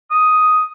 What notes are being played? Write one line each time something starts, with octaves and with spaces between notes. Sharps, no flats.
D#6